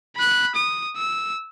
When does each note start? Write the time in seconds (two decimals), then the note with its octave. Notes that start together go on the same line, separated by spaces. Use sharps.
0.17 B5 F#6
0.56 D#6
0.97 E6